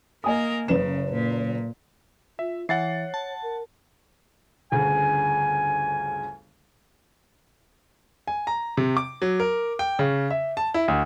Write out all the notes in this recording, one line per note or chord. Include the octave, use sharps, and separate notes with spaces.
A#3 A#4 D#5 G#5 D#6
F#1 C#3 B4 E7
A#2
F4 E5
E3 C#5 F#5 A6 C7
A5
A#4
G1 D2 C#3 G#5
G#5
A#5
C3
D6
F#3
A#4
G5
C#3
E5
A5
E4
D2